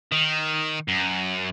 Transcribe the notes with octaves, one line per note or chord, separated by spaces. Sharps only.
D#3
F#2